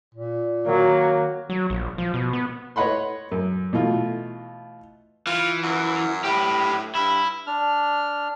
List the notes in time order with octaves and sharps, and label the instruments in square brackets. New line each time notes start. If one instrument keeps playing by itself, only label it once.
[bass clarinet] A#2
[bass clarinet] D#3 [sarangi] F#3 [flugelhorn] A#3
[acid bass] F#3
A#1
F3
B2
B3
[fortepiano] B4 C#5 D#5 F#5 B5 C6
F#2
B2 E3 A3 F4
[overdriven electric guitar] E3 [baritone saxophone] F4
[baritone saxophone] F#2
[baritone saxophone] A2 [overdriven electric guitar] G4 B4
[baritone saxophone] G2 [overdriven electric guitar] E4
[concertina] D4 F6